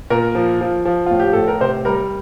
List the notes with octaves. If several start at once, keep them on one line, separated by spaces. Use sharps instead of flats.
A#2 A#4
F3
F3
F3
A2 F4
G4
A2 A4
A#4
C3 C5
G3 A#4